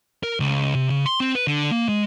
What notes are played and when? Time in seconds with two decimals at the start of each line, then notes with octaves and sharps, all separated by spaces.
0.23 A#4
0.40 C#2
0.75 C3
0.90 C#3
1.06 C6
1.20 C4
1.35 B4
1.47 D3
1.71 A#3
1.89 G#3